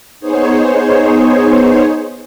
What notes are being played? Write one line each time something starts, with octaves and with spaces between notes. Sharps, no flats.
B3 D#4 G#4 C5 C#5